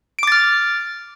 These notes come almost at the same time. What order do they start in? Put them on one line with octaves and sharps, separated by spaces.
D7 D6 A6 F6